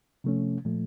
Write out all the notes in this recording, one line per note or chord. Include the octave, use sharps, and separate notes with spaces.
C3 F3 A3 C#4
A#2 F3 A3